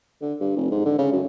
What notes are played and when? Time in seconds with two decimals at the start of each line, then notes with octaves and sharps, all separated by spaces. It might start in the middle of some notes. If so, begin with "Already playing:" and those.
0.22 D3
0.41 G2
0.56 F1
0.71 G#2
0.85 D3
0.98 C#3
1.12 F#2